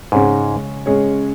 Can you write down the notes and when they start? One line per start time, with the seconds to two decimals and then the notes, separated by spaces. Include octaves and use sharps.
0.12 G#2 C#3 G#3 C#4 G#4 C#5
0.86 C#3 G#3 C#4 G#4 C#5